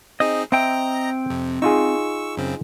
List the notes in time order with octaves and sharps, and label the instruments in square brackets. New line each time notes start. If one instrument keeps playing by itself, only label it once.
[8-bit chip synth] C4 D#4 G#4 [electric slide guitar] D#5
[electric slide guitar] C4 G5 [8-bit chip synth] D#5 A#5 A#6 [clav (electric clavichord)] E5
[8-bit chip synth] F2 C3
[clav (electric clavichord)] D#4 F4 G#4 [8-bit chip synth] C#6 E6
[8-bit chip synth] F#2 C#3 C4